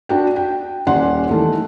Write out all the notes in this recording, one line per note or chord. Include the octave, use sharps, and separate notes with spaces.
D4 F#4 G5
G5
D#1 C#4 D5 F#5 C6
D#3 E3 A3